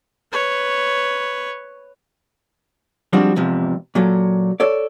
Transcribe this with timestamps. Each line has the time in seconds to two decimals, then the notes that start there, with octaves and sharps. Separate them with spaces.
0.32 B4 C#5
3.13 F3 G3 G#3 C4 D4 F#4
3.36 E2 G#2 C3 F3
3.95 A#2 F#3 A4
4.60 A4 C#5 D5